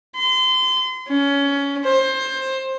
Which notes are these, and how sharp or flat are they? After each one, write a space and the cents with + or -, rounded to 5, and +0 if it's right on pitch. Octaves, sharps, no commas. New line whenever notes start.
C6 -30
C#4 +20
C5 +20